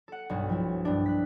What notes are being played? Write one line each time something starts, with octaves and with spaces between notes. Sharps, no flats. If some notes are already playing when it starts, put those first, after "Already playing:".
A4 F#5
B1 G2 B2
F3 F#3 E4
G2 D4
F#6 B6